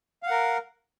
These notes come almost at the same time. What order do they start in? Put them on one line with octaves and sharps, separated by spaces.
F5 F#5 A#4